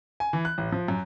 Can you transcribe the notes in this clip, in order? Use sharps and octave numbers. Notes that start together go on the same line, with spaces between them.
G#5
E3
F#6
A1
F3
F#2